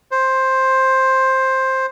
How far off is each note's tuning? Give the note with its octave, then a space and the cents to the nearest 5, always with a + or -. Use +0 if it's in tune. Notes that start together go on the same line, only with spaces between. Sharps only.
C5 +10